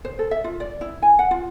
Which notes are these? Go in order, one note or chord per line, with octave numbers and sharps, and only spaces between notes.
C5
A4
E5
F4
D5
E4
G#5
F#5
F4